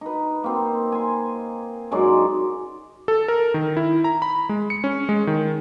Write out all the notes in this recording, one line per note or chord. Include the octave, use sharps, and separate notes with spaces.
D#4 B4
A#3 C4
G#5 C6
F#2 G#3 D#4 D5
A4
A#4
D#3
E4
A#5
B5
G#3
C#7
C#4
G#3
D#3